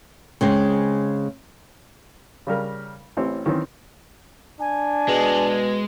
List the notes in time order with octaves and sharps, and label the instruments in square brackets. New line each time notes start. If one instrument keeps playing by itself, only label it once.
[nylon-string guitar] C#3 G#3 C4
[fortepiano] C#3 G3 A#4
A1 E3 C4 C#5
D#3 E3 C4 C#4
[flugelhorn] D4 [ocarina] G#5
[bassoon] B2 [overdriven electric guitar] G#3